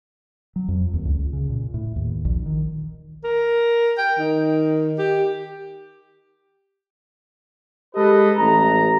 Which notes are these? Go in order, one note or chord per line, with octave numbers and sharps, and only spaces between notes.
F#3
F2
D#2
C#2
C#3
A#2
A2
D#2
A#1
D#3
A#4
G5
D#3
G4
G#3 G4 A4 B4 D#5
A1 A#5